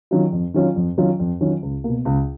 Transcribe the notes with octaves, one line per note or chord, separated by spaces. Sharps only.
D#3 F#3 C#4 F4
F2
D#3 F#3 C#4 F4
F2
D#3 F#3 C#4 F4
F2
D#3 F#3 C#4 F4
C#2
B2 A#3
C#2